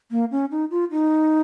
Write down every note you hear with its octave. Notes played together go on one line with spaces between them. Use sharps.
A#3
C#4
D#4
F4
D#4